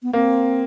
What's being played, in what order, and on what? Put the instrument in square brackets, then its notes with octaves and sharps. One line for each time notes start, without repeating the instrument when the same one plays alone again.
[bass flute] B3
[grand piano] A#3 [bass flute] C4